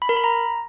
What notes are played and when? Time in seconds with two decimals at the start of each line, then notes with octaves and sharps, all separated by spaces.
0.02 B5
0.09 A#4
0.17 B5
0.24 A#5